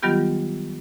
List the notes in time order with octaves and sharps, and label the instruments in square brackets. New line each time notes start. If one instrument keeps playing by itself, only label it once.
[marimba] D#3 F#3 G3 B3 F4 G4